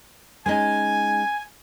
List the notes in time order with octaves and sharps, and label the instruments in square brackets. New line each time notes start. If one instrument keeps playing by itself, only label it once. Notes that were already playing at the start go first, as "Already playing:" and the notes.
[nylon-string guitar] G#3 C#4 D#4 [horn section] G#5